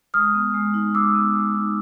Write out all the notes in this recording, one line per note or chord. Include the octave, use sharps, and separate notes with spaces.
G#3 D#6 F6
B3
G#3
D#4
G#3 D6 E6
B3
G#3
D#4